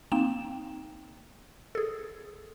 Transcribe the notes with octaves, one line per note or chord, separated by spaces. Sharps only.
A#3 C4 D#4 G5 E7
G#4 A4